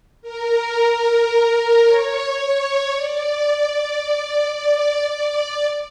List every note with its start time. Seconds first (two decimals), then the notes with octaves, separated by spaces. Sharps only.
0.22 A#4
1.84 C#5
2.37 C#5
2.92 D5
4.53 D5
5.07 D5